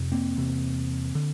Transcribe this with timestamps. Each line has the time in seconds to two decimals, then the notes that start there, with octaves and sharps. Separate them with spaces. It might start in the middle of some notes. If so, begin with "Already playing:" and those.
Already playing: F2 C3
0.12 A#3 C4
0.37 E2 C3
1.15 D3